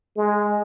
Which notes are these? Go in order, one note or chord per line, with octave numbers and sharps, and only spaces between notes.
G#3